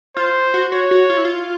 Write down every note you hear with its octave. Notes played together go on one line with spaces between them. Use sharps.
F4 C5
F#4
F#4 C#5
F#4
F4
E4
F4